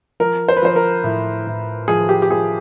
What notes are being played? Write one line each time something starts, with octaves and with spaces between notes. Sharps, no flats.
F3 A#4
C5
B4
F3 C5
A#4
A2
A2
F3 G#4
G4
G4
F3 G#4